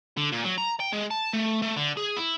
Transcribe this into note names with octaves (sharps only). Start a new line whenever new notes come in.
D3
A#2
F#3
A#5
G5
G#3
A5
A3
A3
D3
G#4
E4